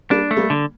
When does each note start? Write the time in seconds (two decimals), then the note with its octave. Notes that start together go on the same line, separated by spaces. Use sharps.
0.11 G3 A#3 D4
0.31 A3
0.36 G3 A#3
0.50 D3